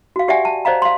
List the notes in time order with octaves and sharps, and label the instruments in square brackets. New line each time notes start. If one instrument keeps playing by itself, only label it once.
[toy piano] F#4 F5
G4 D5 E5 F#5 G#5
A5
C5 D5 D#5 F5 A#5
F5 C6